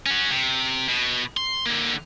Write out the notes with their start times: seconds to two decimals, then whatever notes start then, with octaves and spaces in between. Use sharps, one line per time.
0.06 C#4 F#4
0.31 C3
0.89 B2
1.37 C6
1.66 D3 A#3